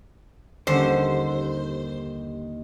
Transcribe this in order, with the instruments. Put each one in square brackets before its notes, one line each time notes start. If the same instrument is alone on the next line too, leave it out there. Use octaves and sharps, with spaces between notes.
[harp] D#2 [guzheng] D3 [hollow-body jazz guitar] G3 C#4 [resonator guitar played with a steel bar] C5